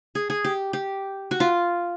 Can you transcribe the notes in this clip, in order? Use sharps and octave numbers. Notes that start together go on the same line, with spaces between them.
G#4
G#4
G4
G4
F#4
F4